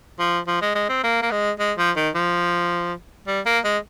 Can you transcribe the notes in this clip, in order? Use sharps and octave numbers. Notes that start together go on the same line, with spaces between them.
F3
F3
G#3
G#3
C4
A#3
A#3
G#3
G#3
F3
D#3
F3
G3
A#3
G#3